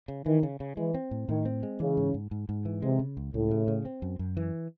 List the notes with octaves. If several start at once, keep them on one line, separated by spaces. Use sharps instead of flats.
C#3
D#3 E3
C#3
C#3
E3 G#3
C4
A2
A2 D#3
C4
G#3
C#3 E3
G#2
G#2
G#2
G#2
E3
C3 G#3
C#3
C#2
C#2 A2
C#3
C#3
C4
F#2
F#2
E3